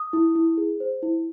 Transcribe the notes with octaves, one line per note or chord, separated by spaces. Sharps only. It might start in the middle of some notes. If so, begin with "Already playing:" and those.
Already playing: D#6
E4
E4
G#4
C5
E4